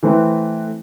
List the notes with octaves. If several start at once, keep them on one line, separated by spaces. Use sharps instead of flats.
E3 A3 C4 E4 B4